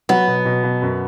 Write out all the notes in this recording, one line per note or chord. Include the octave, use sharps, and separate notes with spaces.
F#3 B3
B2
B2
B2
F#2